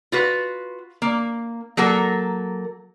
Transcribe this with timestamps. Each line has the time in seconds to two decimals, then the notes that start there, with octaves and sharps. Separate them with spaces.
0.12 F4 F#4 B4
1.02 A#3
1.77 F#3 A#3 A4 A#4